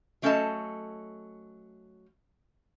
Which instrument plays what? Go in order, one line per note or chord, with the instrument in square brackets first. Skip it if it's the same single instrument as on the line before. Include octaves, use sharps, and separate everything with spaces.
[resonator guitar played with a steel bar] F#3 A3 C#4 A4 D#5 A5